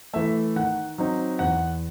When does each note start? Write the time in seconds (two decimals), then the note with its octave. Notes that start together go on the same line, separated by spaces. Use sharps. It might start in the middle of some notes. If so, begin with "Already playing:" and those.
0.13 E3 A3 E5
0.56 D#3 F#5
0.98 F#3 C4 D#4
1.39 E2 F#5